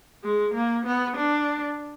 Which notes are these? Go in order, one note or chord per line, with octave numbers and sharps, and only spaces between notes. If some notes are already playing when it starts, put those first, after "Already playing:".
G#3
A#3
B3
D4